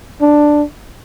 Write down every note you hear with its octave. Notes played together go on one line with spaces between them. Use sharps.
D4